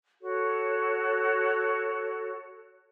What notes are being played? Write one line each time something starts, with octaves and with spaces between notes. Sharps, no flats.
F#4 A4 C#5